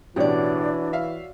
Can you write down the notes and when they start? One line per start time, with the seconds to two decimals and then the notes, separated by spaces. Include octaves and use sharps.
0.16 A1 B2 E3 D4 F#4 G4 C#5 D5
0.93 E5 F5